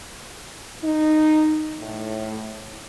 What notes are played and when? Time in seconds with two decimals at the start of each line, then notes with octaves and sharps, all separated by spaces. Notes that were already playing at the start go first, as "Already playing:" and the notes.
0.83 D#4
1.80 A2